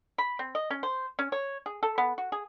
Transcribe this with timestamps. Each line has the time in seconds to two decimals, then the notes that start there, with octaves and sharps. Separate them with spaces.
0.18 B5
0.39 C4
0.55 D#5
0.70 C#4
0.83 C5
1.19 C#4
1.32 C#5
1.66 G#4
1.83 A4
1.98 B3
2.18 F#4
2.32 G#4